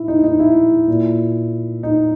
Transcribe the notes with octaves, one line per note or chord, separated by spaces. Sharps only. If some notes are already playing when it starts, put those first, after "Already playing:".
Already playing: A#2 E4
D#4
D#4
E4
A#2
D#4